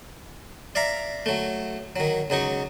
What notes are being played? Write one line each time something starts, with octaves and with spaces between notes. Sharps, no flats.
D5 E5 F5 A#5
F#3 A3
D#3 F#3
C#2 F#3 D#4 C#6